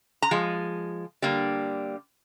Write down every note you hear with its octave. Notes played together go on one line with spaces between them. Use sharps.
A#5
F3 G#3
D3 G3 A#3